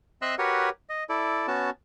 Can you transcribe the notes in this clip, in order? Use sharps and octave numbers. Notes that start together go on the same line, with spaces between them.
C4 D#5 E5 C6 E6 F#6
F#4 G4 A#4 B4 C#5 F#5
D#5
E4 A4 D5
B3 C#4 F#4 A5